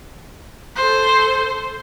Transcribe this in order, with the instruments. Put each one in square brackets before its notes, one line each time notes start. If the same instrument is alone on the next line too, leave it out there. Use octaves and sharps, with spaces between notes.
[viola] A4 C5